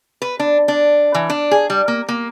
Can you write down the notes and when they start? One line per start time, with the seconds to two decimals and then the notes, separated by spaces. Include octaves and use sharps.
0.22 B4
0.39 D4
0.68 D4
1.15 E3
1.30 D4
1.51 G#4
1.70 G3
1.88 A#3
2.08 A#3